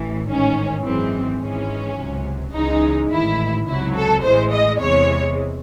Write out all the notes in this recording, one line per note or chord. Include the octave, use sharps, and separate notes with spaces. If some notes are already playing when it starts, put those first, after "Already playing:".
Already playing: A1 A2 E3
A1 G#2 D#3 C#4
G#1 F#2 E3 G#3 C4
G#1 G#2 E3 G#3 C#4
C#2 C3 F#3
C#2 C#3 E3 G#3 D#4
A1 G#2 D#3 E4
C#2 C3 F#3 E4
A4
A1 A2 E3 G#3 C5
D#5
E2 C3 E3 G#3 C#5